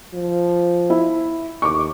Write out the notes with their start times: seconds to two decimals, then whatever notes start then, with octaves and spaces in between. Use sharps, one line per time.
0.14 F3
0.90 E4
1.62 D#2 C#6 D6